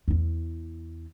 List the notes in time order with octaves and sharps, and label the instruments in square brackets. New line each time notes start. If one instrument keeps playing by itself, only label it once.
[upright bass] E2 E4